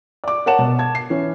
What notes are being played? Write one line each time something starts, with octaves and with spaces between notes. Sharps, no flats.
D5 D6
A#4 C#5 F#5 A5 E7
B2
A5 G#6
C7
E3 C#4